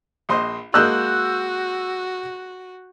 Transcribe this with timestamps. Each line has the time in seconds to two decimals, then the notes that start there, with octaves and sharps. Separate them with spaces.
0.29 A#1 C5 D#5
0.74 G#3 A#3 F#4 D#5 E6 F#6 G6